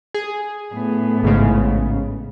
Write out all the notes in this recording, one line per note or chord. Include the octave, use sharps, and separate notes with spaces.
G#4
A2 B3
A1 G#2 C#3